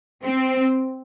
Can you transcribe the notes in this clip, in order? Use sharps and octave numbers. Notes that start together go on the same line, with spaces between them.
C4